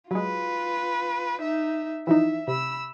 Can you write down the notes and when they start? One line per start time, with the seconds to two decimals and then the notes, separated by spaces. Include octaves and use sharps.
0.11 F#3 G#3 F4 B4
1.41 D#4 E5
2.07 E3 F3 D#4 E5
2.48 C3 B5 E6